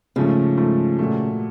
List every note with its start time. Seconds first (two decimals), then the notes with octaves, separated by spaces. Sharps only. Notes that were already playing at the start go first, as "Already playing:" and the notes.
0.16 G#2 C#3 F3 A3
0.57 G#2 F3 A3
0.99 A#2 F#3 A3